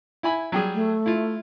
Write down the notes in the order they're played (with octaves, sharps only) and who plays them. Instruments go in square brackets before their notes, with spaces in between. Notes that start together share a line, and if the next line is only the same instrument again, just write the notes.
[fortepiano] E4 G#5 B5
F#3 G3 G#4
[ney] A3
[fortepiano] E4 F4